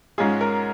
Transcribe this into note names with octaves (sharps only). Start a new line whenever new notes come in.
G#2 G#3 C#4 F4 G#4
A#4